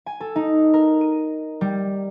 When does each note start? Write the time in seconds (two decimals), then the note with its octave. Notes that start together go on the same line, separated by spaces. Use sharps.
0.06 G#5
0.20 A4
0.36 D#4
0.74 A#4
1.01 D#7
1.61 G3